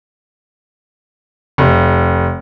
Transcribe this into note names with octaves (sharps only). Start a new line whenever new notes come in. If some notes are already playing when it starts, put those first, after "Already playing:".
F1